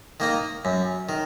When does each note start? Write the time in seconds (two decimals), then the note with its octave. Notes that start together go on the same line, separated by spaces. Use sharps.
0.20 D#3 A#3 D#4
0.65 F#2
1.09 D#3